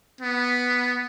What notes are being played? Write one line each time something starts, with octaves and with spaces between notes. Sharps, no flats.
B3